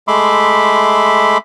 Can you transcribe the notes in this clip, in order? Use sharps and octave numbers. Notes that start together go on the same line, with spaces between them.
G#3 A3 E5 B5 C6 D6